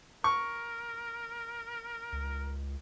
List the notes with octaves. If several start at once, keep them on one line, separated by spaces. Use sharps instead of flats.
A#4 C#6
C#2